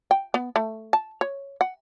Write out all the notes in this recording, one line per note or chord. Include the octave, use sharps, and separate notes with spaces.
G5
B3
A3
A5
C#5
F#5